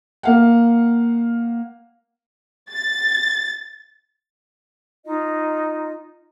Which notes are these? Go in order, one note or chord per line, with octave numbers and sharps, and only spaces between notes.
A#3 F5 F#5
A6
D#4 F4 D#5